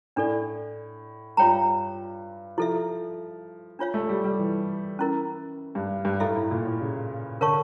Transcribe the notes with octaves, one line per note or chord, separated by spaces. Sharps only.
A2 D4 A4 D5
G2 F4 C#5 G5 A#5
F3 E4 A4 E5
D4 F4 C#5 F5
A3
G3
G3
E3
C#4 E4 A#4
G2
G2
A2 E4 A4 E5
A2
A#2
A2
C#3
D3 A#4 C#5 F5 A5 C#6